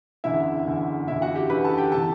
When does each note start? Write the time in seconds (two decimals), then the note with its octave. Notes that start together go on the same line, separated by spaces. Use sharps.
0.24 F#1 E2 D3 E4 E5
0.66 F#1 E2 D3
1.08 F#1 E2 D3 E4 E5
1.22 F#4 F#5
1.36 G4 G5
1.50 F#1 E2 D3 B4 B5
1.64 A4 A5
1.77 G4 G5
1.92 C3 E3 A4 A5